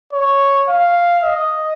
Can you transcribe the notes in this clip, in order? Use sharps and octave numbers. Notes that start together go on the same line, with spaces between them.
C#5
F5
D#5